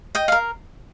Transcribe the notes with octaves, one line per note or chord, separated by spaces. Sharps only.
D#5 G5
A#4 F5